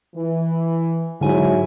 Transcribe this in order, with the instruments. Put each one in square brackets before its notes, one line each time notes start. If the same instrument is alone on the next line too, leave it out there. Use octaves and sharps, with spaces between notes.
[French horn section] E3
[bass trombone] G#2 [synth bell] D3 G#5 [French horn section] F#3 E4